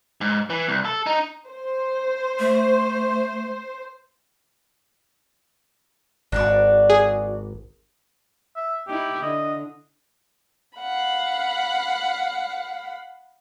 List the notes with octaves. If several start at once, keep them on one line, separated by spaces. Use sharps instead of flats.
G#2
E3
C2
A4
D#4
C5
A3
G#1 D4 F#4 D5
G#4
E5
D#4 E4 G4
D3 D#5
F5 F#5 B5